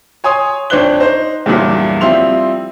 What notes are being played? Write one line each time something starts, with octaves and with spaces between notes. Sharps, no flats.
C#5 G#5 C6 D#6
F2 D4 C5 C#5 F#6 G7
D#4 C5
E2 G2 A#2 E3 F#3
F3 G3 C4 E4 C6 F7